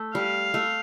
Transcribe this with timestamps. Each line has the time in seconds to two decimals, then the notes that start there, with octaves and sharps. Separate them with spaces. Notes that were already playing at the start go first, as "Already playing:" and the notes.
Already playing: A3
0.15 G3 F5
0.54 A3